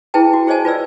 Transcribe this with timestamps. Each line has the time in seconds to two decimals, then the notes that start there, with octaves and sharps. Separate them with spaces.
0.14 E4 G#4 B4 G5 A5
0.34 F#4
0.47 G#4 C5 C#5 D#5 G#5 A5
0.65 F4 B4 D5 E6